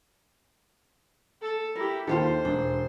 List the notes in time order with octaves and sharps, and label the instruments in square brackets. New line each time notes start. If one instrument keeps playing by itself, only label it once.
[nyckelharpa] A4
[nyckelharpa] E4 G4 [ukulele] A#4
[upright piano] D#2 D#3 [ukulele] F4 G4 A4 [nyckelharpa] C5
[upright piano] E1 [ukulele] D4